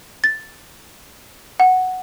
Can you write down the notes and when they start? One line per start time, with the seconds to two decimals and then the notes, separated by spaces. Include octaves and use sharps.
0.24 A6
1.60 F#5